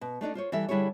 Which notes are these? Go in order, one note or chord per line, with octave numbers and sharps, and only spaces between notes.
B2
A3 D4 D#4 D5
F4 C5 C#5
E3 G3 A4 E5
D3 G3 E4 G4 G#4 C#5